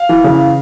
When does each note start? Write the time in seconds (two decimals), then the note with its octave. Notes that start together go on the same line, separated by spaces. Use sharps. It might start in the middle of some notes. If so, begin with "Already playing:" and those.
Already playing: F5
0.09 E3
0.24 C#3